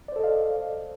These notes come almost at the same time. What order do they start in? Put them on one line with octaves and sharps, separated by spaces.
D5 C5 A4 D#5 F5